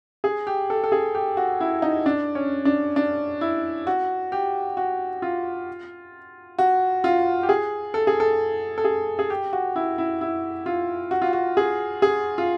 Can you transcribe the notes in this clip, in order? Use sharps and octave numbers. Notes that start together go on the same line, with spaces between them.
G#4
G4
A4
A4
G#4
G4
F#4
E4
D#4
D4
C#4
D4
D4
E4
F#4
G4
F#4
F4
F#4
F4
G4
G#4
A4
G#4
A4
A4
G#4
G#4
G4
F#4
E4
E4
E4
F4
F#4
F4
F#4
G#4
G#4
F4